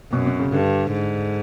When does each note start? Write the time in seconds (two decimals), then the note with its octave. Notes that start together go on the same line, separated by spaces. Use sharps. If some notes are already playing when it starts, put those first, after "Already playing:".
0.13 F#2 B2
0.26 B2
0.40 C#3
0.52 G2 D3
0.92 G#2